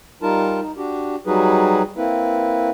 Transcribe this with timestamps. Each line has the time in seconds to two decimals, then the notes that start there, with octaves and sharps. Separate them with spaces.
0.22 G3 D#4 F4 A#4 A5
0.61 D#4
0.77 D4 F#4 G4
1.26 F#3 G3 D#4 F#4 G#4 B4
1.97 A#3 C4 E4 B4